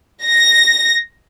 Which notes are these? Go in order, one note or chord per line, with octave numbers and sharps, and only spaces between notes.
A#6